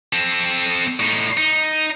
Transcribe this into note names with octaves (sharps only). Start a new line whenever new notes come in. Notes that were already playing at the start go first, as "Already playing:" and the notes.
C4 A4
A2 D#4
D#4